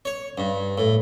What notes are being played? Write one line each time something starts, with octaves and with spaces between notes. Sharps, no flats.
C#5
G2
A2